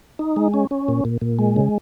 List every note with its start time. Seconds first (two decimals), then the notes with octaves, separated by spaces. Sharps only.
0.19 D#4
0.36 G#3
0.54 C#4
0.71 C#4
0.88 A#2
1.05 A#2
1.21 A#2
1.39 G#3
1.56 C#3